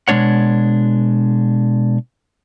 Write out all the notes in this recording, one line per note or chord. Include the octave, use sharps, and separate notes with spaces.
B2 G#3 A#3 D4 C#5 F#5